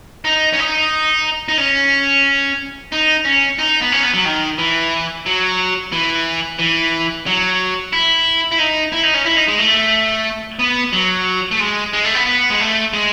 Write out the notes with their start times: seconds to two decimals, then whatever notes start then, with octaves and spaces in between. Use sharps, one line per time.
0.25 D#4
0.53 C#4
0.59 D#4
1.48 D#4
1.58 C#4
2.92 D#4
3.25 C#4
3.59 D#4
3.82 B3
3.92 C#4
4.03 B3
4.14 F#3
4.25 D#3
4.58 E3
5.26 F#3
5.92 E3
6.59 E3
7.26 F#3
7.93 E4
8.51 E4
8.59 D#4
8.92 E4
9.03 D#4
9.14 C#4
9.26 E4
9.37 D#4
9.48 G#3
9.59 A3
10.59 B3
10.93 F#3
11.51 A3
11.59 G#3
11.93 G#3
12.04 A3
12.15 B3
12.26 B3
12.50 G#3
12.60 A3
12.93 G#3